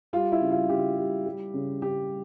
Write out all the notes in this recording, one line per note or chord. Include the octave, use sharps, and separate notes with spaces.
G3 F4
E4
C#3
F4
C#3 G4
G3
G3
C#3
C#3 G4